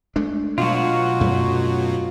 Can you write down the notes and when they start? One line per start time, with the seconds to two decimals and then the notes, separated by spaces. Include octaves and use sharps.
0.16 G#3 A3 D4
0.58 B2 F#3 F4 F#4
1.21 F#2 A3